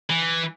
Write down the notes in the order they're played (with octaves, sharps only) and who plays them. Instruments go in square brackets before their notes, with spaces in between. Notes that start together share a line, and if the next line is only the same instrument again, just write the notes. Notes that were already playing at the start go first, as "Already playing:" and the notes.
[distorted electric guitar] E3